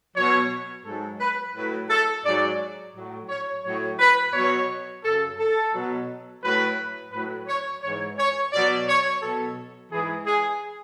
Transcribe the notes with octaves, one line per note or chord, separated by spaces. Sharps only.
B2 F#3 C#5
G#2 F#3 A4
B4
A2 F#3 B4
A4
G#2 D5
F#3
A2 F#3
C#5
A2 F#3 C#5
B4
B2 F#3 C#5
F#2 C#3 F#3 A4
A4
B2 F#3
A2 F#3 B4
A2 F#3 B4
C#5
G#2 E3 C#5
C#5
B2 F#3 D5
C#5
B2 F#3 A4
G#2 E3 G#4
G#4